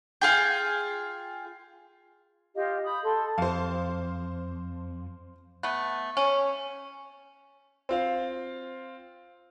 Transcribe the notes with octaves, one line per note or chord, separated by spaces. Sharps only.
F4 G#4 G5
F4 G4 D#5 F5
B5 D#6 G6
A4 C6
F2 C5 F5
A3 B3
C#4
C4 F4 F5